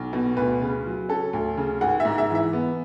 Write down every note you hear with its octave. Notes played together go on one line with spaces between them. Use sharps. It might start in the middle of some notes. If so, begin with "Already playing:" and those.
Already playing: B1
B2
D2 B4
C#3
F#3
C#4 A4
D2
C#3
G#1 F#5
E5
G#2
E5
E3 E5
B3